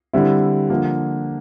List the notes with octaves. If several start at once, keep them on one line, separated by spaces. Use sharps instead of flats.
D3 G3 C4 E4
D3 F3 A#3